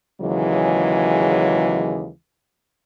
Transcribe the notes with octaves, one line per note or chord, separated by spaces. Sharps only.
D#2 C#3 E3 F#3 G#3